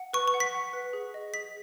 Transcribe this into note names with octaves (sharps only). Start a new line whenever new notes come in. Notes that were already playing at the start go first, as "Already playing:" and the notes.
Already playing: F#5
B4 C#6
C#6
F#5
B6
F#5
B4
G#4
D#5
G#4 B6